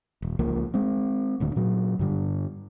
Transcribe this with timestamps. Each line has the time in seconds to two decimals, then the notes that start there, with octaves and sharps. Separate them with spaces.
0.22 D#1
0.39 C#2 F3 A#3
0.74 G#3 C4
1.40 D#1 D2 D3
1.56 A#2 F#3
1.99 G2 D3 G3